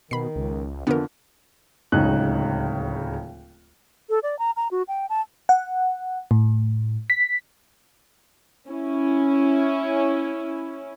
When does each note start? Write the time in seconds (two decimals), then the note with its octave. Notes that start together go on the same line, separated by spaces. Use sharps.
0.11 B2 D#3 B5 C7
0.36 C#2
0.87 F2 D3 E3 B3 A#4
1.92 D1 C#2 C#3 D#4 F#6
4.10 A4
4.23 D5
4.39 A#5
4.57 A#5
4.71 F#4
4.88 G5
5.10 A5
5.49 F#5
6.31 A2
7.10 B6
8.67 C#4 E4